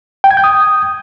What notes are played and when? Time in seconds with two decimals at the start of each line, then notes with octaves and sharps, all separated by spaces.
0.24 G5
0.31 G#6
0.37 G6
0.44 D#6